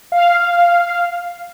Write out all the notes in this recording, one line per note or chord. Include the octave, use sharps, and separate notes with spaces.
F5